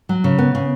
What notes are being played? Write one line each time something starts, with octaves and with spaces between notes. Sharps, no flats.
F#3
C#3
B3
C#3